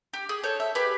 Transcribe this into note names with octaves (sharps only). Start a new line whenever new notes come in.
G4
G#4
A4 C#5 G6
E5
G4 G#4 B4